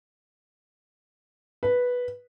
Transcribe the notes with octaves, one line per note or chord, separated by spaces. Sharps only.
B4